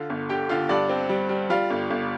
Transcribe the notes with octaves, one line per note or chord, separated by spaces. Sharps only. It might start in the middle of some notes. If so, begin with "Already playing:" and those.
Already playing: D3 F4 F5
G1
D3 G4 G5
D3 F4 F5
G2 D4 D5
C4
G3
G3
G3 F4 F5
G1
G1